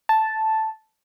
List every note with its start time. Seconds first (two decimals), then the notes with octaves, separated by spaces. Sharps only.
0.09 A5